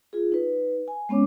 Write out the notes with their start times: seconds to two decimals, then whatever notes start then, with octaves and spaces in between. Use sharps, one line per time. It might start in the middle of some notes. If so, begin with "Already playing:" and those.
0.13 F4 G#4
0.32 D#4 B4
0.88 G#5
1.09 G#3 B3 C#4 C#5 D6